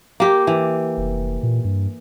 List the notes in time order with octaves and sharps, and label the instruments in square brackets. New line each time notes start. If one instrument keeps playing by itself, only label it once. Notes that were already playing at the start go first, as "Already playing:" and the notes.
[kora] A#3 G4
E3
[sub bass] F1
A#2
G2